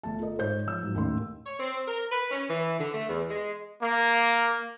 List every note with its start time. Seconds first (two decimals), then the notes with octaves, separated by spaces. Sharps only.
0.03 G1 A3 A5
0.19 F4 A4 A#4 D#5
0.39 G#2 C5 C#5 D#5 G6
0.67 F3 E6
0.83 G#2 F#3
0.95 D#2 A2 D#3 A3 C#4 C6
1.46 C#5
1.60 C4
1.87 A#4
2.11 B4
2.31 C#4
2.50 E3
2.80 D3
2.94 A3
3.09 E2
3.30 G#3
3.82 A#3